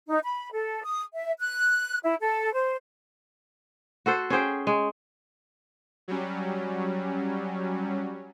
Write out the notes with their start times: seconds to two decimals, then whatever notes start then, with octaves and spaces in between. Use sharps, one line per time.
0.08 D#4
0.23 B5
0.52 A4
0.84 D#6
1.14 E5
1.40 F#6
2.04 E4
2.20 A4
2.54 C5
4.06 F#4 A4 C5
4.30 C#4 G#4 C5 G5
4.67 G#3
6.08 F#3 G3 C#4